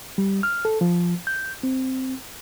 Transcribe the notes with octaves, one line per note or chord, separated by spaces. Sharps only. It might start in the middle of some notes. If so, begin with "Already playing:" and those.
G3
F6
A4
F3
G6
C4